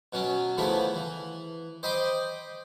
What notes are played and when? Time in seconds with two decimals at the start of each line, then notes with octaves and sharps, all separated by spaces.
0.13 B2 F#3 C#4
0.58 C#3 E3 F3 A3 B3 E4
0.95 E3
1.83 C5 D#5 G5 B5 C6 D6